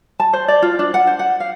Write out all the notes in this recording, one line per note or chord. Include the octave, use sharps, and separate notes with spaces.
A5
C5
D5
F4
D4
F#5
C5
F#5
F5